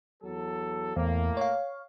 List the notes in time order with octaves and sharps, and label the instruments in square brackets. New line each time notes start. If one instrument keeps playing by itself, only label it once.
[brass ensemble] E2 F#3 A4
[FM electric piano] E2 [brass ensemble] A2 A#3
[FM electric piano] C#5 F5